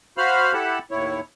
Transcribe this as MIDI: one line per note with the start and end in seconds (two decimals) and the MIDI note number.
0.18 0.53 66
0.18 0.53 72
0.18 0.53 77
0.18 0.53 83
0.18 0.53 89
0.54 0.79 64
0.54 0.79 67
0.54 0.79 69
0.54 0.79 78
0.54 0.79 81
0.54 0.79 83
0.91 1.20 39
0.91 1.20 45
0.91 1.20 64
0.91 1.20 73